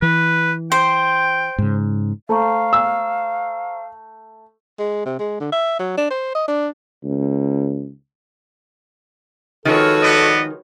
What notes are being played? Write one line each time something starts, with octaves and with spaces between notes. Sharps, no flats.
E3 B4
C5 G5
G#2 C#3
A3 C5 F5 A#5 C#6
E6
G#3
C3
G#3
D3
E5
F#3
D4
C5
D#5
D4
C#2
D#3 F3 G#3 F#4 A4 B4 C#5
B3 D5 D#5